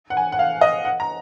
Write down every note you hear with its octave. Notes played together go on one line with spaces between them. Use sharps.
F#5
G#5
F#5
F5
D#5
F#5
A#5